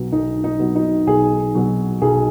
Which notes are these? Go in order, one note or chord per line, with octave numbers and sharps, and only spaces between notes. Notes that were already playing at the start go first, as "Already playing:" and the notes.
Already playing: B1 B2 F#3
B1 D#4
D#4
B2 F#3
D#4
B1 G#4
B2 F#3
B1 G#4